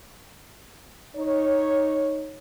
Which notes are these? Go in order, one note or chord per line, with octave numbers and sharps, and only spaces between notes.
D#4 C#5